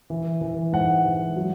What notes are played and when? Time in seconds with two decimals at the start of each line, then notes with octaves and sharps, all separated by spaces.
0.10 E3
0.41 E3
0.73 G#2 F#5
1.05 E3
1.36 F#3